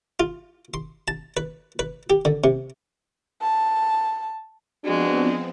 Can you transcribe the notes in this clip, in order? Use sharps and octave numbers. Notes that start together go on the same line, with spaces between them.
F4
C6
A5
B4
B4
G4
D3
C3
A5
F3 G#3 B3 C4 D4 F#4